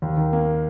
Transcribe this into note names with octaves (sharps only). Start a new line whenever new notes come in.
D#2
D#3
A#3